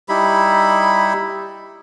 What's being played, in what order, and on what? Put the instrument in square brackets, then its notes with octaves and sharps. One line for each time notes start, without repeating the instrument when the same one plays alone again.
[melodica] G3 D#4 E4 B5